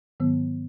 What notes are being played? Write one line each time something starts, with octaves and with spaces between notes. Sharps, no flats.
G#2 D#3 F#3 B3